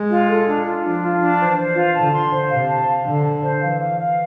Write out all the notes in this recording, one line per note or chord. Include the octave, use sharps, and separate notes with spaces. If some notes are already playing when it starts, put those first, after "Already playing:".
Already playing: G#3
F4
A4
D4
F4
F3 D4
F4
D4
E3 C5
C5
F4
D3 A5
C6
C5
C3 F5
A5
F5
D3 A5
A5
C5
E3 F5
F5
F5